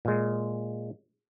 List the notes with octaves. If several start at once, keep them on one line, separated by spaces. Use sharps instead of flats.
A#2 G#3